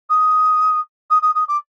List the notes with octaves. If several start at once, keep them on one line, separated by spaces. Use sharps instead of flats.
D#6
D#6
D#6
D#6
D6